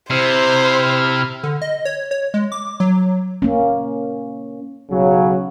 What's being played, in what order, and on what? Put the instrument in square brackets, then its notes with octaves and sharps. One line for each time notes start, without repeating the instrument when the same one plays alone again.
[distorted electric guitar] C3 [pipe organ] E4 F6 [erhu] C5
[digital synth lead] D3
D#5
C#5
C#5
G#3
D6
F#3
[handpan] A#3 C#4
[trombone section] B1 F#3 [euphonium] C#3